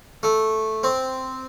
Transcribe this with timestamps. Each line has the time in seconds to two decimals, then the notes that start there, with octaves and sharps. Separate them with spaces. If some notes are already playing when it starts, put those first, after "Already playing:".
0.23 A3
0.83 C4